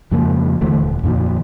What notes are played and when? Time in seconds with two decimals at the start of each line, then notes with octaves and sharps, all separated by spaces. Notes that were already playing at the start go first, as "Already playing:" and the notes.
0.11 F2 C#3 G#3 A#3
0.61 D#2 D3 E3 A3
0.79 D#1
1.03 F2 A#2 D#3